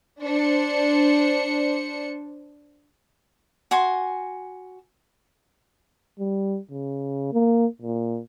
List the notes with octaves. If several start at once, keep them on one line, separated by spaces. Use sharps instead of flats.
D4 C5 C#7
F#4 G#5 C6
G3
C#3
A#3
A#2